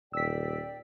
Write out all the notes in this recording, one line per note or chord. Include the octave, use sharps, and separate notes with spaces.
D#1 D5 G5 E6 B6